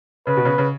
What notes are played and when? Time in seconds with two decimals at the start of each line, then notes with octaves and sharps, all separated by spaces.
0.27 C#3 B4
0.37 B2
0.45 C#3
0.58 C#3